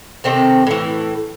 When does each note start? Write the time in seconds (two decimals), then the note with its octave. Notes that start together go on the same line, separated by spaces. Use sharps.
0.24 C3 D#3 C4 A4
0.67 A2 E3